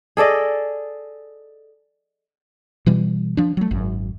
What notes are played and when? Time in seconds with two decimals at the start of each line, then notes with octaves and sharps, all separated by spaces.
0.17 G#4 A4 D5 D#5
2.86 B2 E3 G3
3.37 F3 D4
3.57 F#3 A3
3.71 G#1 F#2